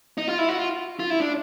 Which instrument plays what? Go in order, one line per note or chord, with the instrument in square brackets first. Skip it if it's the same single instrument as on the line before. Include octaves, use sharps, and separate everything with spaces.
[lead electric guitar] D#4
F4
E4
F#4
F4
F4
E4
D4